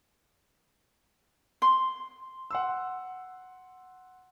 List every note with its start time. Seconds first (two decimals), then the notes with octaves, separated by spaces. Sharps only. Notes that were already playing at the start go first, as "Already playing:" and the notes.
1.62 C6
2.51 F#5 C6 E6